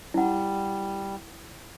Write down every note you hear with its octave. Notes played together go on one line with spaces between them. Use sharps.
G3 E4 F#5